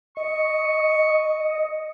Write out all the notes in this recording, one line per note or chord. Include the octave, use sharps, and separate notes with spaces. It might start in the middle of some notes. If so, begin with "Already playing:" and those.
D#5 C#6